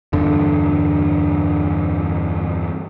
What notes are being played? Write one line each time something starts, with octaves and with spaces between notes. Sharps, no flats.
E2 G2 D3